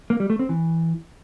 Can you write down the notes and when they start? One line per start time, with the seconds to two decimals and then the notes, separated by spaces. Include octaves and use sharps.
0.10 A#3
0.20 G3
0.30 A3
0.39 C4
0.49 E3